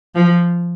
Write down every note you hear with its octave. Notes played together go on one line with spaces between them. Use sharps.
F3